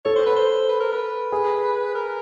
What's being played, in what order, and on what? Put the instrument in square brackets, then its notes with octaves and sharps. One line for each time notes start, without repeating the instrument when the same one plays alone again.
[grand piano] A4 [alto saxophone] C#5
[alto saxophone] C5
B4
C5
B4
A#4
B4
[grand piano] G#4
[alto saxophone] A#4